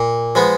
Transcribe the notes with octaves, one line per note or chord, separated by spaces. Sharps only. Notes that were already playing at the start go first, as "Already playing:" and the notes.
Already playing: A#2
F3 G#3 B3